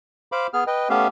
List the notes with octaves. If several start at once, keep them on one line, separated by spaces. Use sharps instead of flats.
C5 F5 B5 D6
B3 G#4 F6
B4 D#5 G5
A3 B3 C#4 G4 E5 F5